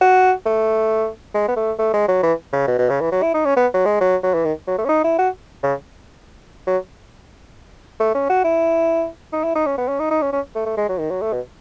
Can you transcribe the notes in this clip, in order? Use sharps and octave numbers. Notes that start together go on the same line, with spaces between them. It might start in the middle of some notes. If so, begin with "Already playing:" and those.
F#4
A3
G#3
B3
A3
A3
G#3
F#3
E3
C#3
B2
B2
C#3
E3
F#3
E4
D#4
C#4
B3
F#3
G#3
F#3
F#3
E3
D#3
F#3
A3
C#4
D#4
E4
F#4
C#3
F#3
A3
C#4
F#4
E4
D#4
E4
D#4
C#4
B3
C#4
D#4
D#4
C#4
C#4
A3
A3
G#3
F#3
D#3
F#3
A3
B2